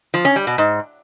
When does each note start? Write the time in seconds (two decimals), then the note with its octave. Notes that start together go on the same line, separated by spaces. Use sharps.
0.14 F3
0.25 C#4
0.36 G3
0.47 B2
0.58 G#2